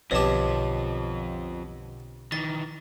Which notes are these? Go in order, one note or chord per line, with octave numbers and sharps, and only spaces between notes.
B1 F2 B2 D3 F3 G4 C#5 A5
D#3 E3 A6